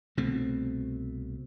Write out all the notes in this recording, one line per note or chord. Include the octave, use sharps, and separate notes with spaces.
C2 B2 A3 C4